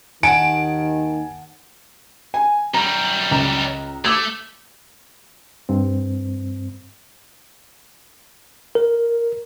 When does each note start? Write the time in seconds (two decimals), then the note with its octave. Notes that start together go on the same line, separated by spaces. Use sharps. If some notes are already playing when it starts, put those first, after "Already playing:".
0.23 D#2 D#3 F#5 G#5 A5 D7
2.34 G#5
2.74 F#2 G3 A#5
3.31 C#2 A#5 E7
4.05 A3 D6 E6 G#6
5.69 G2 C4
8.75 A#4